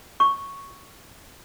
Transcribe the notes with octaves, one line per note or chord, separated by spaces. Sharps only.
C#6